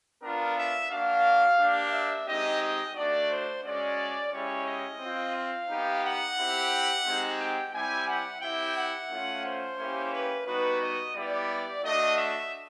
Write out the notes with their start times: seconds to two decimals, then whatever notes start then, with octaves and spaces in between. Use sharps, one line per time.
0.21 B3 D4 F4 A#4
0.56 E5
0.90 A#3 D4 F#4 F5
1.58 A#3 D4 G4
1.92 E5
2.27 G#3 C4 D#4 G4 D#5
2.61 D#5
2.95 A3 D4 F#4 D5
3.29 C5
3.63 G#3 C#4 F#4 D5
4.31 G#3 C#4 E4 G4 C#5
4.66 D#5
4.99 C4 F4
5.34 F5
5.68 B3 D#4 G4
6.02 F#5
6.37 C4 E4 G4
7.04 G#3 C4 D#4 G4
7.38 G5
7.72 G3 C4 E4 G4 G#5
8.07 F#5
8.40 C4 E4 G4 G5
8.75 F#5
9.10 A3 C#4 F4
9.44 C5
9.77 A#3 C#4 E4 G4
10.12 B4
10.46 G3 B3 D#4 F#4 B4
10.80 D#5
11.14 G3 B3 E4 G4 D5
11.82 A3 D4 F#4 D#5
12.16 E5